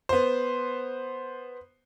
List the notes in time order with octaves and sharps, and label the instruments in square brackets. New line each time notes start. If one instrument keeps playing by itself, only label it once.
[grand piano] B3 C5